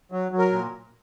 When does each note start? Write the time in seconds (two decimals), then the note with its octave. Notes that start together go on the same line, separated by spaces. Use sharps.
0.12 F#3
0.32 F#3
0.39 A#4
0.52 A#2